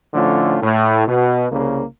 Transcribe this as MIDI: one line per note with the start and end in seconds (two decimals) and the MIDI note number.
0.14 0.57 45
0.14 0.57 50
0.14 0.57 53
0.14 0.57 57
0.14 0.57 61
0.14 0.57 65
0.63 1.06 45
1.07 1.46 47
1.52 1.83 36
1.52 1.83 49
1.52 1.83 58